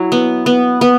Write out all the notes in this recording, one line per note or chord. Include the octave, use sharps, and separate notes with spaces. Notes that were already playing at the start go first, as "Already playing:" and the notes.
Already playing: F#3 E4
B3
B3
B3